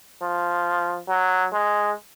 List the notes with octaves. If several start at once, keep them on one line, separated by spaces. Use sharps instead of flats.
F3
F#3
G#3